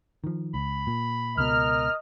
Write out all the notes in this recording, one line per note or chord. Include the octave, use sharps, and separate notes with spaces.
D#3 F3
C#2 B5
A#2
C#2 B2 A#4 D#5 F6